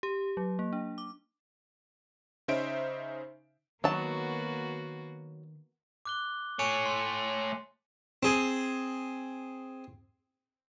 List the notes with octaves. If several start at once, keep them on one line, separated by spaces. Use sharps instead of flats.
G4
F#3
A#3
D4
D6
C#3 C#4 D#4 C5 E5 D7
D#3 F#3 A#3 B3 F#4 A5
D6 F#6 G7
A3 C#5 G#5 C#7 D#7
C6
C4 G#4